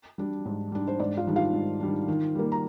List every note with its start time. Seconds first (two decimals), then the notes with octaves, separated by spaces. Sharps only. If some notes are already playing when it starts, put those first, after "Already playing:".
0.18 G3 D4
0.45 G#2
0.72 G3 D4
0.88 C5
0.99 G#2 D4 D5
1.17 F4 F5
1.27 D#3 G3 D4
1.36 F4 F5
1.53 G#2
1.80 D#3 G3 D4
2.08 D#3
2.35 G3 A#3
2.52 A#5